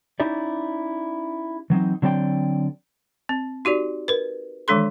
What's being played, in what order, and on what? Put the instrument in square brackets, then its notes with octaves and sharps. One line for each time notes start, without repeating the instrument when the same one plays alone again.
[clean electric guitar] C#4 D#4 E4 G4 D5
E3 F#3 C4 D#4
D3 F#3 C4 D5 G5
[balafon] C4
D#4 F#4 G4 D5
A#4 B4
D#3 E3 G#3 D4 A4 C6